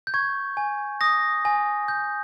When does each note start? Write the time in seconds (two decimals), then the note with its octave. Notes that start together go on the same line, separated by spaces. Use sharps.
0.07 G6
0.14 C#6 G#6
0.57 G#5
1.01 D#6 A#6
1.45 G#5
1.88 G6